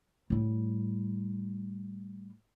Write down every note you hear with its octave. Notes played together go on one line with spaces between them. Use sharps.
A2 G3